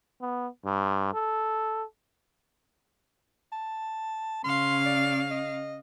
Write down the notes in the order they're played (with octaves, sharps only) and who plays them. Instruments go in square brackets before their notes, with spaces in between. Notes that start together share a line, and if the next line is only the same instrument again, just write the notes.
[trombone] B3
G2
A4
[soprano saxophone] A5
[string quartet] C#3 F5 [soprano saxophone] C6
[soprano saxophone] D5
D#5